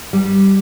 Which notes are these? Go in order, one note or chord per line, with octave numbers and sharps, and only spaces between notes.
G3